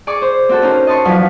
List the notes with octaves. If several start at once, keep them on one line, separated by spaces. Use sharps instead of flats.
G#4 D5 C#6 D6
C5
C4 F#4 A4
C#4 D#4 A#4 C5
D#5 A5 C6 C#6
E2 G2 F3 F#3 B4 D#5